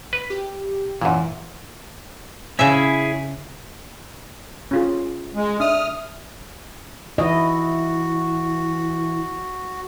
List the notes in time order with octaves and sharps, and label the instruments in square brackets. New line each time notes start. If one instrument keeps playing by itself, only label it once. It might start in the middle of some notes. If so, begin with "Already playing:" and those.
[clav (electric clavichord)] B4
[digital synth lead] G4
[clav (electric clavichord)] F#2 A#2 [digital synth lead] E3
[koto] C#3 E5 [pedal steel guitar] C#4 E4 G#4
[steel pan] C#4 F4 G#4
[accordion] G#3
[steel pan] D4 [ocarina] E5 [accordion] D#6 F6
[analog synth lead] E3 [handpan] E4 D#5 [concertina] F#4